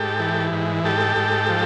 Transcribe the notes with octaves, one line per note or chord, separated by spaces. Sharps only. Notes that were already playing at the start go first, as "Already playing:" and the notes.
Already playing: G#2 G4 A4
E3
G#2
G#2 G4 A4
G#2
F3